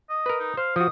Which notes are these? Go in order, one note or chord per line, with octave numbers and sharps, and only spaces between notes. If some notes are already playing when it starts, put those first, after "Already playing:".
D#5
A#4 B4
D#4
C5 F5
F3 F#4 D#6